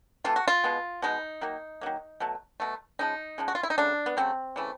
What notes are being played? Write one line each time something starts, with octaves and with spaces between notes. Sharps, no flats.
C3 E3 A3 F4
F#4
F4
B2 G#3 B3
B2 G#3 B3 D#4
D#3 F#3 A#3
D#3 F#3 A#3
B2 F#3 A3
B2 F#3 A3
C#3 F3 G#3 D#4
C#3 F3 G#3
F#4
F4
E4
D#4
C#3 F#3 A3 D4
B3
C#3 F#3 A3 C4
C#3 E3 A3